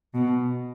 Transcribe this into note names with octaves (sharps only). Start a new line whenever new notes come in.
B2